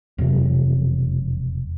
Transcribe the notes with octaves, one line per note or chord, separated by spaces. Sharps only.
E1 F2 C3 F#3